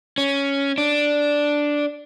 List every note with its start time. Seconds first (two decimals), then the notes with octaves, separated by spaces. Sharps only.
0.18 C#4
0.78 D4